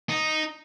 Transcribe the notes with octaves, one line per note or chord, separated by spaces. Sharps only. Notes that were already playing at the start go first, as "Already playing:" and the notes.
D#4